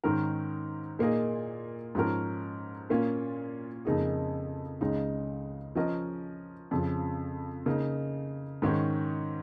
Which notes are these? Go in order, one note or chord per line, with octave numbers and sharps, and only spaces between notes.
G#2 D#3 C#4 A#4
A#2 A#3 D#4 G#4 D#5
G#2 F3 C#4 A#4
A#2 A#3 C#4 F4
F2 C#3 A#3 D#4 G#4
C#2 C#3 G#3 D#4
F3 C#4 A#4 D#5
F2 C#3 F3
C#3 A#3 D#4
G#2 D#3 C#4